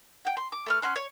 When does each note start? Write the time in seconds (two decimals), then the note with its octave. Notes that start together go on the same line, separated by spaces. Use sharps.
0.25 F#5 G5
0.37 C6
0.52 D6
0.66 A3 B4 F6
0.82 C#4 F#5 C6 F#6
0.96 C#5